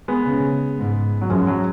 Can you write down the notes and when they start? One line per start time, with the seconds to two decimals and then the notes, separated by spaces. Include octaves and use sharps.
0.08 G#3 B3
0.26 C#3
0.78 G#2
1.21 F#3
1.30 F#2 F3 G#3
1.47 F#3